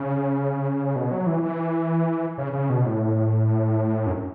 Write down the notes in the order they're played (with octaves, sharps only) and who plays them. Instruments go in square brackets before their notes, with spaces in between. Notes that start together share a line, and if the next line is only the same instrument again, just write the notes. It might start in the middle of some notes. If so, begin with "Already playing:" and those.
Already playing: [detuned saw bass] C#3
B2
F#3
E3
E3
C#3
C#3
B2
A2
F#2